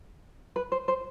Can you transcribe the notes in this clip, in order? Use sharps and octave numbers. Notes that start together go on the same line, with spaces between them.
B4
C5
C5